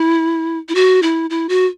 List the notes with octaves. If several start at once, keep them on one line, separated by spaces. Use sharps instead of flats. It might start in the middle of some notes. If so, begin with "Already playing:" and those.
Already playing: E4
E4
F#4
E4
E4
F#4